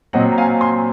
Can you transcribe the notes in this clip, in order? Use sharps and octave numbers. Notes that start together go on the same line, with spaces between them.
A#2 F#3 C4 D#5 F#5
A#5
F5 G#5
G#5 C6